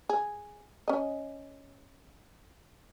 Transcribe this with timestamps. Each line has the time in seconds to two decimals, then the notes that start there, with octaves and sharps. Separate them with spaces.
0.09 G#4
0.88 C#4 D#5